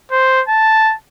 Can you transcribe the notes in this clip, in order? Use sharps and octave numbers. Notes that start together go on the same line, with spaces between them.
C5
A5